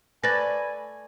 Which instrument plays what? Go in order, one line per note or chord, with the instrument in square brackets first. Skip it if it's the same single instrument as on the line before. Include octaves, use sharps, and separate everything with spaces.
[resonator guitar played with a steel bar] A3 A4 D5 [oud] B4 [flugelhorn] G#5 [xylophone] A6 A#6